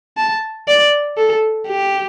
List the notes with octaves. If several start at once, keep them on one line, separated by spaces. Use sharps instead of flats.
A5
D5
A4
G4